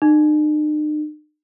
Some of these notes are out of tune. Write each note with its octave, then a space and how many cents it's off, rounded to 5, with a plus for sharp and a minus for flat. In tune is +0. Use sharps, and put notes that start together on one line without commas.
D#4 -45